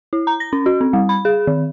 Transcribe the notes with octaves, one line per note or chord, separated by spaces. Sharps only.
E4
A#5
A#6
C#4
F#4
C4
G3
B5
G#4
D#3